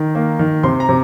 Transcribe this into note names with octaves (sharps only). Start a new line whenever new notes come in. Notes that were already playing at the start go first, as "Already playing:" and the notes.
Already playing: D#3
A#3
D#3
C3 C6
A#5
C3